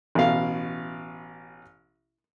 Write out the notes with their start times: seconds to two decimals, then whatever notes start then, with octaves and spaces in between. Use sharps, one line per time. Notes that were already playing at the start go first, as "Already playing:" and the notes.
0.15 A1 B2 F5